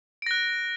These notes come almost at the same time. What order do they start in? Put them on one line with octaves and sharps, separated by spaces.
D7 A#6 F#6